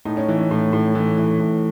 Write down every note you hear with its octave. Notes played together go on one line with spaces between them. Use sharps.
A2 D#4
C#4
E3
C#4
A2
A2
E3
E3
A2